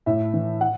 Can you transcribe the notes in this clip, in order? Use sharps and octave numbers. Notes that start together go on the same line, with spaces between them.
A2 E5
E3
F#5